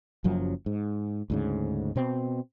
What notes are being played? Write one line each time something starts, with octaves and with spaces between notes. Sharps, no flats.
F#1 F#2 F3 F#3
G#2
D2 G#2 C#3
B2 C4